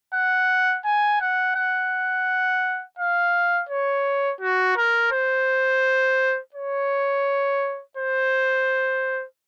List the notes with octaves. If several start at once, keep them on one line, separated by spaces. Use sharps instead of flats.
F#5
G#5
F#5
F#5
F5
C#5
F#4
A#4
C5
C#5
C5